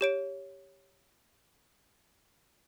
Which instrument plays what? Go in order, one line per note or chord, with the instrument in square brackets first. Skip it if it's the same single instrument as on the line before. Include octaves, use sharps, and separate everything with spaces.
[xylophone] G4 C#5 D7